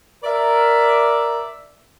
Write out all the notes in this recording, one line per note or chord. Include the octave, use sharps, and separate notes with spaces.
A#4 D5 E5